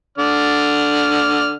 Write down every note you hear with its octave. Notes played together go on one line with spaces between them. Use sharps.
D3 D5 F6